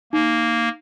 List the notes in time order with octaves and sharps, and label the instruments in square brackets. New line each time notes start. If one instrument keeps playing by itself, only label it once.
[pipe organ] A#3 [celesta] D#4